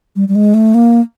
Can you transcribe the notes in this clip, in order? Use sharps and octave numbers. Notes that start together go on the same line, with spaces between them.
G3
G3
G#3
A3
A#3